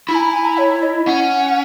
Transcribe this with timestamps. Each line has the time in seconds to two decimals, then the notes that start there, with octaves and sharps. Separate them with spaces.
0.08 E4 B5
0.15 G#5
0.20 A#5
0.32 G#5
0.45 A#5
0.57 C#5
0.83 D#5
1.07 C#4 F#5